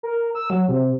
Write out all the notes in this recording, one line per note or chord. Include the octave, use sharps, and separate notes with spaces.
A#4
E6
F#3
C3